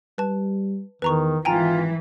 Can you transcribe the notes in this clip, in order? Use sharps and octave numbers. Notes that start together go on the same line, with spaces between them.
G3 B4 A5
E2 D#3 B4 A#5 C#6
G#1 E3 F4 G5 G#5 A#5